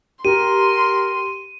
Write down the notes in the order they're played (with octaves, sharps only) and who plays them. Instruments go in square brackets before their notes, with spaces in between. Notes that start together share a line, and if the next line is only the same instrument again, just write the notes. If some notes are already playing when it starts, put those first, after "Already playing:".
[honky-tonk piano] G4 [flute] A#4 [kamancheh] C6 [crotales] D#7